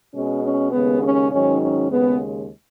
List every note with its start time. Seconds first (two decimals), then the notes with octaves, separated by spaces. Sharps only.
0.13 B2 G#3 C#4
0.43 C#4
0.72 D#2 C#3 G#3 B3
1.01 C#4
1.31 G#2 D#3 F#3 C#4
1.61 C#4
1.90 D#2 C#3 G#3 B3